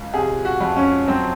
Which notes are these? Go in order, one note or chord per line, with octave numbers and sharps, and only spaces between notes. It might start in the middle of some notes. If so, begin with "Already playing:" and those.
Already playing: C#2
C3 G#4
F#4
F2
C#4
F#3 C4